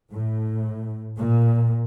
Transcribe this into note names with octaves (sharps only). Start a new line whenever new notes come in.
A2
A#2